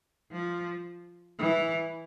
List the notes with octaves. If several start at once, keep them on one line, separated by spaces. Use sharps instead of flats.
F3
E3